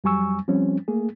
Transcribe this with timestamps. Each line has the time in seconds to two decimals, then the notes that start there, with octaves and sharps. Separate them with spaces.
0.04 F2 F#3 G3 G#5 C#6 E6
0.48 F3 G3 C4 C#4
0.88 A3 A#3 G#4